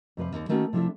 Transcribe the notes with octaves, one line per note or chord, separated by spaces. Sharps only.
F2 C3 B4 F5
D#2
D#3 A3 A#3 C#4 F#4
C3 F3 D4 E4 A4 E5